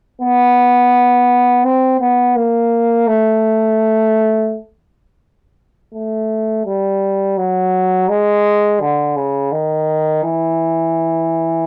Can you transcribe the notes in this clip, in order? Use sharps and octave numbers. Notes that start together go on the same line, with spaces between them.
B3
C4
B3
A#3
A3
A3
G3
F#3
G#3
D3
C#3
D#3
E3